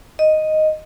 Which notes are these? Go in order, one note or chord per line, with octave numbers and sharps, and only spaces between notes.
D#5